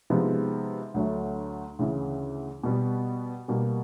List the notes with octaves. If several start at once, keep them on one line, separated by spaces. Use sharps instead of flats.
C3 F3 G#3 B3 D#4
D2 D3 F#3 A3
D2 C#3 E3
B2 G3 B3
B2 G3 A#3